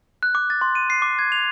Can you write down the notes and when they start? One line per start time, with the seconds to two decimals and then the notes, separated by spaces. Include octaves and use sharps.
0.23 F#6
0.35 D6
0.50 A6
0.61 C6
0.75 D#7
0.90 C7
1.02 D6
1.19 G#6
1.32 F7